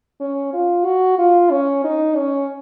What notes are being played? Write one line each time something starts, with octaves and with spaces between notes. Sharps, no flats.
C#4
F4
F#4
F4
C#4
D#4
C#4